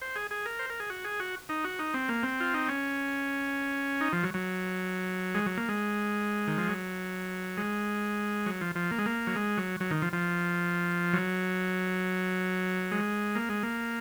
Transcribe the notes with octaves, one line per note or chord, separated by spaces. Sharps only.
C5
G#4
G#4
A#4
C5
A#4
G#4
F#4
G#4
F#4
D#4
F#4
D#4
C4
A#3
C4
F4
D#4
C#4
D#4
F3
F#3
F#3
G#3
F#3
A#3
G#3
D#3
F3
F#3
G#3
F#3
F3
F3
A#3
G#3
A#3
F#3
G#3
F#3
F#3
D#3
F3
F3
F#3
G#3
A#3
G#3
A#3